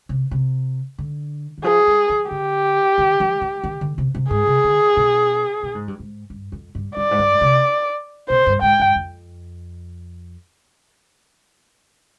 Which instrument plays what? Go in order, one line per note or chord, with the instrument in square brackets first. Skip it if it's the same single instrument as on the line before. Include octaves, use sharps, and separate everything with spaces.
[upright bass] C3
C3
D3
D#3
[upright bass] F3 [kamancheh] G#4
[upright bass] G3
F3
[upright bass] D3 [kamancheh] G4
[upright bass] D#3
F3
F3
D#3
D3
C3
C3
[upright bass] G#2 [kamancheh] G#4
[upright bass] C3
D3
B2
B2
G#2
G2
G#2
G2
F2
G2
[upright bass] G2 [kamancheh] D5
[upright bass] G#2
G2
C3
[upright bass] B2 [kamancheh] C5
[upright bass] G2
[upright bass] G#2 [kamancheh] G5
[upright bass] G2
F2